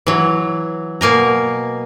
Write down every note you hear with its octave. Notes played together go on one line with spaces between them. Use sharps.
E3 F#3
B2 A#3 G#5 A#5